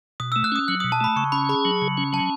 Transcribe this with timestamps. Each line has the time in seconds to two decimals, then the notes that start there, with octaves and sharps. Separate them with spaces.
0.20 B2 D#6
0.32 E6
0.36 A3
0.44 F#6
0.52 C#4 D#6
0.68 F#3 F#6
0.80 D#6
0.84 B2
0.92 A5
1.01 A3 B5
1.16 C#3 C#6
1.32 C#4 B5
1.49 G#4 B5
1.65 F#3
1.82 C#3
1.98 C#4
2.13 F#3 A5